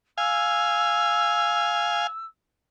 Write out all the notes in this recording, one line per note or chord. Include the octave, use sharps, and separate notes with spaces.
F5 G#5 E6